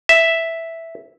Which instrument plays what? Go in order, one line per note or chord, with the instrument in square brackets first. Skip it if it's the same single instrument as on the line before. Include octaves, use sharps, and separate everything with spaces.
[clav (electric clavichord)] E5